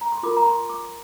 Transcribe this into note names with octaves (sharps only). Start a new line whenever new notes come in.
A#5
C6
F4 A#4 D6
A#5
C6
D6